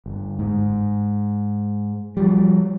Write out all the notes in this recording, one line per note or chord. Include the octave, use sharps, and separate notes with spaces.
G1
G#2
F3 G3